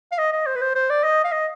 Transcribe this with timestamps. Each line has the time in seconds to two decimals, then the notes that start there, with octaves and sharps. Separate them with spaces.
0.12 F5
0.19 D#5
0.33 D#5
0.47 C5
0.56 B4
0.62 C5
0.75 C5
0.90 D5
1.04 D#5
1.24 F5
1.32 D#5